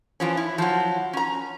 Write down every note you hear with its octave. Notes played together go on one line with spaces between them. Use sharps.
E3 F3 C#4
E4
F3 F#3
C#4 A#5